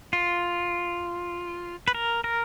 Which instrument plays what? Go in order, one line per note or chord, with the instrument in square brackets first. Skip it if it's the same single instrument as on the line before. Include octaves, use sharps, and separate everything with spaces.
[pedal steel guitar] F4
B4
A#4
A#4